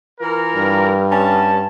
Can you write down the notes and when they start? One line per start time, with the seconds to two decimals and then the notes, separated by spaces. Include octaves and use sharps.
0.21 E3 F4 A#4
0.55 G2
1.12 C#4 A5